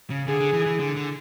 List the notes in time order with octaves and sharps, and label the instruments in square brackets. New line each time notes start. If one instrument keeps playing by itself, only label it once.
[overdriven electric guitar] C#3
[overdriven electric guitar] D3 [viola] G#4
[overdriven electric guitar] D3
E3
E3
D3
D3